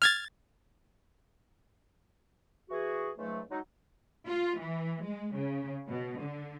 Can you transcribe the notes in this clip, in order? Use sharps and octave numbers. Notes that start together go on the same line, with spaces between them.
F6 G#6 A6
E3 F#4 G#4
C#2 G#2 F#3 A3
F#3 G#3 D#4
F4
E3
G#3
C#3
B2
D3